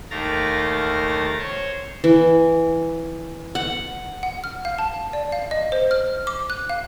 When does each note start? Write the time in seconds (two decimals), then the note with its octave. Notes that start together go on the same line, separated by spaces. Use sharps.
0.10 D#2 A3 A#4 F5 A#5 A6
1.38 C5 C#5
2.04 E3
3.55 F#5
4.23 F#5
4.44 F6
4.65 F5
4.78 A5
5.13 D5
5.32 F5
5.51 D#5
5.72 C5
5.91 F6
6.27 D6
6.50 F#6
6.69 F5